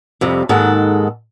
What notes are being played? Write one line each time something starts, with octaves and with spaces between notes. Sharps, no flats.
F2 C3 G3
D#2 G#2 D#3 G#3 A4 F#5